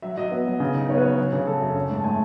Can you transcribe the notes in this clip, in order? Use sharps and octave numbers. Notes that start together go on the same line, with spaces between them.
F#3 E5
F#3 D#5
B3
F#3
C#3
D#4
B3 C#5
B4
F#3 C#5
F#3
C#3
F#3 A4
F#2
C#4
G#2 A5
A3 G#5